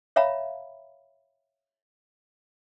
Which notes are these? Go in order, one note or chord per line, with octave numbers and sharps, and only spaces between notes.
C#5 E5 F5 A#5 B5